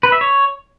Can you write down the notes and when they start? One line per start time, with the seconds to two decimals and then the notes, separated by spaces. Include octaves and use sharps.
0.03 B4
0.12 E5
0.21 C#5